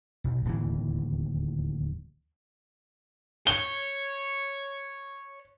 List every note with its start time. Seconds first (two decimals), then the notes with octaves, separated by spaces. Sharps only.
0.24 B1
0.45 D1 D#2 E3
3.47 C#5 G7